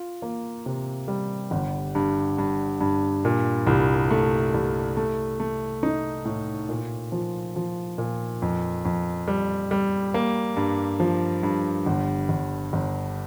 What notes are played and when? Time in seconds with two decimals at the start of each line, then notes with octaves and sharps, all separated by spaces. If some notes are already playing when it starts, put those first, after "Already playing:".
Already playing: F4
0.22 A#3
0.66 C3
1.08 G3
1.51 G1
1.95 G2
2.38 G2
2.81 G2
3.25 A#2
3.67 C2
4.11 A3
4.54 C2
4.97 A3
5.40 A3
5.83 D#4
6.25 A2
6.69 A#2
7.12 F3
7.56 F3
7.98 A#2
8.42 F2
8.85 F2
9.28 G3
9.71 G3
10.14 A#3
10.57 G2
11.00 F3
11.43 G2
11.86 G1
12.29 G1
12.73 G1